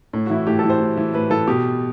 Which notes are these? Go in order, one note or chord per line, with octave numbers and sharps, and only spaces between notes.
A2
F#4
E3 E4
A2 G4
E3 A4
C5
A2
E3
A2 B4
E3 A4
B2 G4